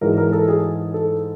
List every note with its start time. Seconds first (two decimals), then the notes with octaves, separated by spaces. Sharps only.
0.01 G#2 E3 G#3 A#4
0.18 A#4
0.33 A4
0.48 G#4
0.94 A4